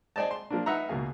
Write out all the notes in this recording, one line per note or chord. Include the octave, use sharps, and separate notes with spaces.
G#4 C5 D5 D#5 A5
C6
F3 A#3 D4
D#4 B4 E5 F#5 A#5
C#2 B2 A#3 G#4 F5